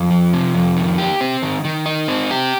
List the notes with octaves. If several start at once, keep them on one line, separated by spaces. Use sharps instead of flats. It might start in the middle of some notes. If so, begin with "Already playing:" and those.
Already playing: F2
F3
C3
F2
D#3
G4
C4
D#3
D#3
D#4
C4
G4